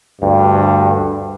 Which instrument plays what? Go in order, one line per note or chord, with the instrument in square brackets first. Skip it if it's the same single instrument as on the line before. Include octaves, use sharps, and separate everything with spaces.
[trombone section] D2 G2